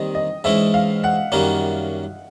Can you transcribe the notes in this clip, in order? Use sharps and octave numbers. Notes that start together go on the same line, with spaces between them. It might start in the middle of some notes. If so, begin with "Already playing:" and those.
Already playing: D#2 D#3 G3 C4 D#5
D#5
G#2 E3 G#3 C#4 E4 E5
F5
F#5
F#2 D#3 G3 A#3 C#4